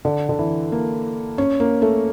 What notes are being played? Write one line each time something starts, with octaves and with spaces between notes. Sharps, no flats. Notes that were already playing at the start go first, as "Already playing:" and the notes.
D3
D3
E3
A#3
C#4
A#3
A3